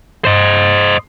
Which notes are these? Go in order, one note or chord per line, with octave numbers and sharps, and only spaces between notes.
C5 D#5